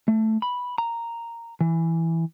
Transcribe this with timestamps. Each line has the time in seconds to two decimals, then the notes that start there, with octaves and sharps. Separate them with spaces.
0.08 A3
0.42 B5
0.78 A#5
1.61 E3